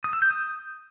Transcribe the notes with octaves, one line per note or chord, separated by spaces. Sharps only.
D#6
E6
G6
D#6